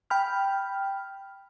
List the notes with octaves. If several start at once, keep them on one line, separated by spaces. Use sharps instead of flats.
G5 B5 F6